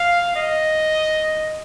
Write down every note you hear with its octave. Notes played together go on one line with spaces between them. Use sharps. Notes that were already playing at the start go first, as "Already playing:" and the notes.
Already playing: F5
D#5